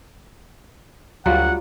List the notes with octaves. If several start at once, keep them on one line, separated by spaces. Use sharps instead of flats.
D2 F#3 G3 F4 F5 F#5 A#5